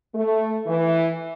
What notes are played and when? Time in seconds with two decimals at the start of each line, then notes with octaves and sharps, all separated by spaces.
0.15 A3
0.67 E3